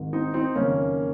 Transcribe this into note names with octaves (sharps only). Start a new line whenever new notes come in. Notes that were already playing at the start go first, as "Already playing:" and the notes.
Already playing: G#1 G#2 D#3
C4 D#4
C4 D#4
F#1 F2 D#3 A#3 C#4